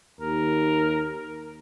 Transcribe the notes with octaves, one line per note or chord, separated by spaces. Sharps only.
D#2 A#4